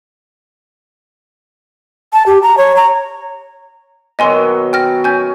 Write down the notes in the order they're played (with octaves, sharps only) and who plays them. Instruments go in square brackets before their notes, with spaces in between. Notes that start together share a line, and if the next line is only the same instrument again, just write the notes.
[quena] A5
G4
A#5
C#5
A#5
[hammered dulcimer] B2 D#3 F#3 [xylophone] D#5 G#5 C6
[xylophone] G5 F6 A#6
[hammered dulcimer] C#4 [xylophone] G#5 G6